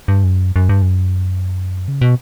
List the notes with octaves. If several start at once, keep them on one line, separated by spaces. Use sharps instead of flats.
G2
F#2
F#2
G2
F#2
C#3
B2